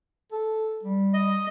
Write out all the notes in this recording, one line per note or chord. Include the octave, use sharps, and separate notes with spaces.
A4
G3
D#5